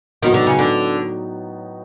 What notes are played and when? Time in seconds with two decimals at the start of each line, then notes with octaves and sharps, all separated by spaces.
0.22 A2 D#3 F#3 B3 D#4 F#4
0.34 D3
0.47 C#3
0.59 D3